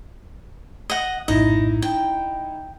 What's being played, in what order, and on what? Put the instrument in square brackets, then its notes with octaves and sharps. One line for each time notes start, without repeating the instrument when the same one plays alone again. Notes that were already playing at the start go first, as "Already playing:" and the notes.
[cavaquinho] D#5 F#5
[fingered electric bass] A#1 F#2 A2 [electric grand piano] D#4 E4 [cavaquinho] D#5
[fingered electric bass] D4 [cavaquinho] G5